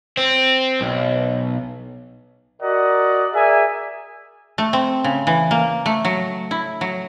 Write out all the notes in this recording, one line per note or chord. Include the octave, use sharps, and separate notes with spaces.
C4
B1
F#4 A#4 D5 D#5 F#5
G#4 A#4 D5 E5 G#5
A3
C4
C#3
E3
A#3
A3
F#3
E4
F#3